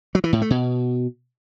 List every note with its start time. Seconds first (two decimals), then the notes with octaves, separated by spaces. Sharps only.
0.15 F#3
0.24 E3
0.33 A2
0.42 A3
0.50 B2